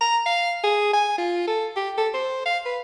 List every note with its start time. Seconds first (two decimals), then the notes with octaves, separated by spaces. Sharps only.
0.01 A#5
0.26 F5
0.63 G#4
0.93 G#5
1.18 F4
1.47 A4
1.76 G4
1.98 A4
2.14 C5
2.46 F5
2.66 B4